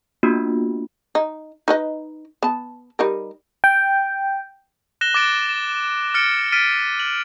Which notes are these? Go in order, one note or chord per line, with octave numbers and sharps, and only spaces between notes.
A#3 B3 D4 F4 F#4
D#4
D#4 B4 D#5
B3 A5
G3 D#4 A#4
G5
F#6 A#6 E7 G7
D6 A6 D7 G7
E7
F6 A6 C#7 D7
F6 A6 B6 D7 D#7
F#7